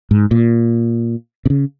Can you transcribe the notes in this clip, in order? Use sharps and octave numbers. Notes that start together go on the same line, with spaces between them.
G#2
A#2
C3
C#3